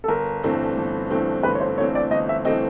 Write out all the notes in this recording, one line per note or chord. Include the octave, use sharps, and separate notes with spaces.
A4
G1 A#4
G2 E3 A3 C4
G1
G2 E3 A3 C4
G1 B4
C#5
C5
G2 E3 A3 C4 C#5
D5
G1 D#5
E5
E3 A3 C4 D#5